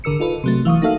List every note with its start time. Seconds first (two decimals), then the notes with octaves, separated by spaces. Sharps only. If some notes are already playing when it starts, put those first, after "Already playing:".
0.04 G#1 D3 A#4 E6 C#7
0.20 D#4 F4 A4 B4
0.44 C3 F#3 A3
0.65 E3 F5 C#6 D#6
0.82 A#3 D#4 F#4 A4 E5 F5